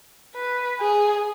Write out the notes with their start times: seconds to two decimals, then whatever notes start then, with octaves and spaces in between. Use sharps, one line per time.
0.35 B4
0.80 G#4